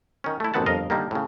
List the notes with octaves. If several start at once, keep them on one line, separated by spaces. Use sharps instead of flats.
D#3 C#4
A3 E4
A1 F#2 B3 C4 F#5 A5
G1 F2 A#4 D#5 F5
D3 D#3 G3 A#3
A2 C#3